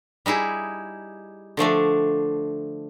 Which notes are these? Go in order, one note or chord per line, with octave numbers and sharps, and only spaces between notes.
G3 D#4 E4 G#4
D3 F3 A3 D4